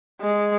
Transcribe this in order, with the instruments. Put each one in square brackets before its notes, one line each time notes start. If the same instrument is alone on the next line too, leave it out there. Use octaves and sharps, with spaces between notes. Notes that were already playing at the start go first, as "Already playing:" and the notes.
[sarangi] G#3